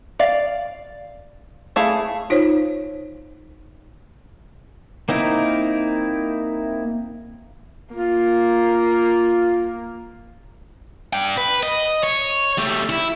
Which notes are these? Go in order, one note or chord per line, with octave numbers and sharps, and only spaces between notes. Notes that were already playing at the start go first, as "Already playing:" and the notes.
D5 F5
A3 E4 G#4 F5
D#4 F4 C5 C#5
A#3 C4 D#4 E4 A#4
A#3 F4
D4 G5
B4
D#5
C#5
G3 A3
E4